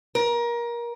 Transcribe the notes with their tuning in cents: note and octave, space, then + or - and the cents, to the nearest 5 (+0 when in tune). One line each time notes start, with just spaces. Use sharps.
A#4 +25